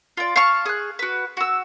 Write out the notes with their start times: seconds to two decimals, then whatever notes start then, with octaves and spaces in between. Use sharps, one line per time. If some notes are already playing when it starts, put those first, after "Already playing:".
0.17 F4 D5
0.36 F5 A5 C#6 F6
0.66 G#4 F#6
0.99 F#4 B4
1.37 F#4 E6